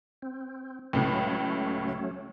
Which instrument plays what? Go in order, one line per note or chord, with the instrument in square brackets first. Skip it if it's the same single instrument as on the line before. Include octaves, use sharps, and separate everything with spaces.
[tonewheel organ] C4
[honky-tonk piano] C#2 A2 C#3 [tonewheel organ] F#3 A3 C#4